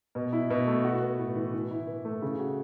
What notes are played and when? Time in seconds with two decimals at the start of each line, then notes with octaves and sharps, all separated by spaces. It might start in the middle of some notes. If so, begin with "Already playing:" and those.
0.15 B2
0.33 E4
0.50 B2
0.67 A3
0.84 F#4
1.02 B3
1.19 A2
1.36 E3
1.54 E3
1.71 E4
1.87 E3
2.05 A3
2.22 C#3
2.39 F#4